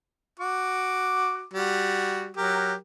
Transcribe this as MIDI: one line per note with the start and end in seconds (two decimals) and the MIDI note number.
0.40 1.44 66
0.40 1.44 86
1.54 2.31 55
1.54 2.31 66
2.37 2.75 54
2.37 2.75 67
2.37 2.75 70